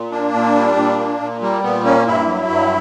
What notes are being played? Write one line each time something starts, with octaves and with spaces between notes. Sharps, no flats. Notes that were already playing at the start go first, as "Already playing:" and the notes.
Already playing: A#2
A#3 D4
A#2
G3
A#2
A#3
A#2
G3 A#3
A#2 B3
A#3 C#4
G2 E4
F#3
G2